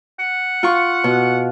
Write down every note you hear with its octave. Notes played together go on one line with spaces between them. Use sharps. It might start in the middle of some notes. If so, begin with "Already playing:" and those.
F#5
F4 C#6
B2